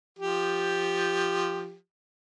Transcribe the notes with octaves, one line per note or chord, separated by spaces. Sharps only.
F3 G4